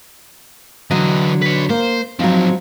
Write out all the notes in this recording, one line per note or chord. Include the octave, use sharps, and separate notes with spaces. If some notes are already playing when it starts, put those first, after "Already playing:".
D3 E3 F#3 D#5
B4 C#5
A#3 C5
D#3 F3 F#3 C4